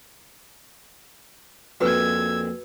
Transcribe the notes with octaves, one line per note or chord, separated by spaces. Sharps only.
A#1 F2 F#4 B4 E6 G#6